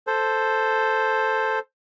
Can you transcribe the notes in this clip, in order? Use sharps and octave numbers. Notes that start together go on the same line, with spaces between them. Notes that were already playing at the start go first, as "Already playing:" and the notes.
A4 C5